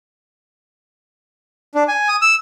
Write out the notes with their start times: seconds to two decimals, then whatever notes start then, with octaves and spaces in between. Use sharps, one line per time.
1.75 D4
1.88 G#5
2.08 D#6
2.22 E6